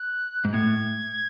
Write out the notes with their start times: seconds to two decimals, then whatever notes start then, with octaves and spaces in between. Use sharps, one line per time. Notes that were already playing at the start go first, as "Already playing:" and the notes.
Already playing: F#6
0.45 G#2
0.53 A2 G#6